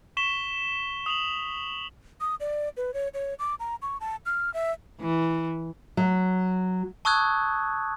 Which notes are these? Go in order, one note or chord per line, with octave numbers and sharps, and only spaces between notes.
C#6 B6 E7 G7
D#6 F7 F#7
D#6
D5
B4
C#5
C#5
D6
A#5
C#6
A5
F6
E5
E3
F#3
A5 C#6 D#6 E6 F#6 G#6